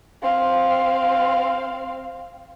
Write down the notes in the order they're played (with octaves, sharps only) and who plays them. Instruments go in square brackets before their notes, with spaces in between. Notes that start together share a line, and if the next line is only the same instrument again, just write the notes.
[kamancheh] C4 F5